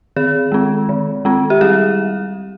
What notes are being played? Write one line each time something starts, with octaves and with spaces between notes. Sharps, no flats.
D#3 G#4
G#3 C4
D#3
G#3 C4
G4
G3 G#4